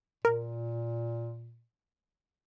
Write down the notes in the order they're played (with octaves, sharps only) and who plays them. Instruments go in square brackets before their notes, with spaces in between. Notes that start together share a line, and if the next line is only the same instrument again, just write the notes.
[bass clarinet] A#2 [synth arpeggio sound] A#4